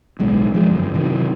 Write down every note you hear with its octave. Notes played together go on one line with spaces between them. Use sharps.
D1 B1 G#3
F3 G#3
G1 F#2
C3 D#3 E3 F#3